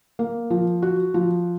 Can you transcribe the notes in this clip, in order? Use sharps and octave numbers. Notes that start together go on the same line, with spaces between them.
A#3
F3
F#4
F3